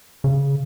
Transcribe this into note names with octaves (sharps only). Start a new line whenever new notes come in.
C#3